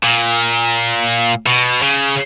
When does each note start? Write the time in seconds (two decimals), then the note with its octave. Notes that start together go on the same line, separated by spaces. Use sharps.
0.03 A#2
1.46 B2
1.82 C#3